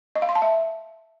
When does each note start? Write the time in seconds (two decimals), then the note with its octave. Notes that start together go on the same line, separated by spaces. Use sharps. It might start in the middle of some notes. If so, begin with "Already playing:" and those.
0.16 D#5
0.22 F5
0.29 C6
0.35 A5
0.42 E5